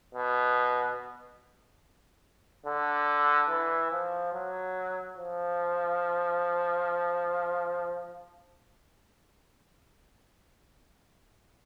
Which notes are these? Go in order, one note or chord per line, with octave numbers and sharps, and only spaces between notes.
B2
D3
E3
F3
F#3
F3